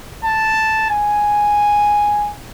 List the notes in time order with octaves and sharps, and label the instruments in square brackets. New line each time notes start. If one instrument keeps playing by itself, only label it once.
[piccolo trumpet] A5
G#5